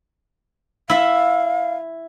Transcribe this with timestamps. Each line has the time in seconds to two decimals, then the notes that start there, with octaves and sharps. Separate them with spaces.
0.90 E4 E5 F5